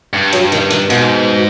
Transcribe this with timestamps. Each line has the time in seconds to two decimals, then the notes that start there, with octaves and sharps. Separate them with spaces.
0.13 G2
0.33 F#3
0.52 D#3
0.70 D#3
0.90 G#2 B2